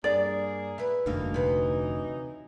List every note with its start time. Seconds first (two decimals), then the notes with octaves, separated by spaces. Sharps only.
0.04 G2 A#3 D4 G#4 D5
0.78 E4 B4
1.06 F1 D2 G2 D3 E3 F#3 A#3 D#4
1.34 C3 B4